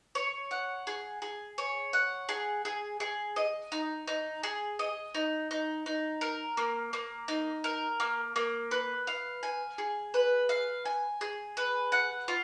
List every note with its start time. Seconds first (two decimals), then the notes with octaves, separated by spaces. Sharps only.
0.15 C#5
0.51 F#5
0.87 G#4
1.22 G#4
1.58 C#5
1.93 F#5
2.29 G#4
2.65 G#4
3.00 G#4
3.36 D#5
3.72 D#4
4.08 D#4
4.43 G#4
4.79 D#5
5.14 D#4
5.51 D#4
5.86 D#4
6.21 A#4
6.57 A#3
6.93 A#3
7.28 D#4
7.64 A#4
8.00 A#3
8.36 A#3
8.71 B4
9.07 F5
9.43 G#5
9.78 G#4
10.14 B4
10.49 F5
10.86 G#5
11.21 G#4
11.57 B4
11.92 F#5
12.28 F4